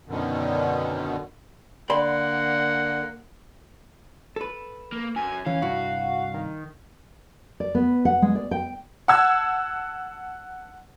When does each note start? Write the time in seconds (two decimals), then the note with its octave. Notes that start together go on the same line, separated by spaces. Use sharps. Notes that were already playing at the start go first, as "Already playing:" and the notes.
0.08 F#2 B2 D3 D#3
1.90 D3 A#3 D5 F#5 B5 C6
4.36 A4 B4
4.92 A#3
5.16 F#2 G#5
5.46 E3 C#4 F5
5.62 C2 G2 E4 F#4
6.34 D#3
7.60 D5
7.75 B3
8.05 F#5
8.22 G#3
8.35 D5
8.51 G5
9.08 F#5 A5 E6 G#6